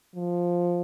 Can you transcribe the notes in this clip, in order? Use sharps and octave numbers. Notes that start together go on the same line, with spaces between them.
F3